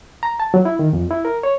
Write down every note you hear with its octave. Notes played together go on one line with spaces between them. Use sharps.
A#5
A5
F#3
E4
D#3
F2
E4
A#4
C#5